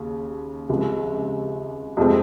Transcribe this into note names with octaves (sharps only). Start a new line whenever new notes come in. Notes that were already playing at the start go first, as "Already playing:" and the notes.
Already playing: D#2 C#3
C#2 C3 F3
F2 C3 F3 G#3 C4